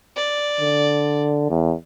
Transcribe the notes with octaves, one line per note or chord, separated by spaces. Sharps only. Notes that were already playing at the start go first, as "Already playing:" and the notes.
D5
D3
E2